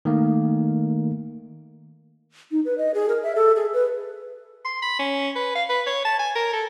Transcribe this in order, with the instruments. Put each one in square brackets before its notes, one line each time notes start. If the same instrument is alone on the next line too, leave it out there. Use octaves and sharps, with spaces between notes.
[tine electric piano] D#3 A3 A#3
[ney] D#4
B4
D#5
G#4
A#4
E5
A4
G#4
B4
[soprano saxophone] C6
B5
C#4
B4
F5
B4
C#5
A5
G#5
A#4
A4